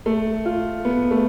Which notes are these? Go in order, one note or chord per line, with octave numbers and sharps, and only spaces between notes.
A3
F4
B3
A3